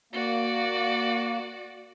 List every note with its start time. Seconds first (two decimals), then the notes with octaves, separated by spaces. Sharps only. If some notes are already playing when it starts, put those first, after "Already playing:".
0.13 A#3 F#4 D5